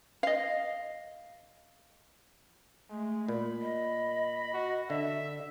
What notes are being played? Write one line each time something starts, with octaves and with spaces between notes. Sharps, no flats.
D#5 F5
G#3 A3
A#2 B5
D#5
F#4
D3 E5